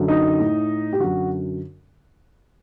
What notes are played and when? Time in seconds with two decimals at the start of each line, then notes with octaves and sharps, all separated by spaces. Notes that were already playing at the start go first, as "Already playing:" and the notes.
Already playing: F#2 D3
0.08 D#4
0.40 A2
0.93 G4
0.99 F#2 D3 F#4